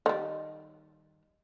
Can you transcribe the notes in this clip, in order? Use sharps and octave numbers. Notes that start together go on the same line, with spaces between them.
D#3 G3